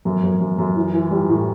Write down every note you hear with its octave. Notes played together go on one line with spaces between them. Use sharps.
F#2
F#2
F#2
F#2
E3
E3
G3
A2